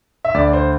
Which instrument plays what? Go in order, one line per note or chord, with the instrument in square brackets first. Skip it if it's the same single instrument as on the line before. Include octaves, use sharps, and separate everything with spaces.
[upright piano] E5
[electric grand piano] D2 [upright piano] D5
[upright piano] C5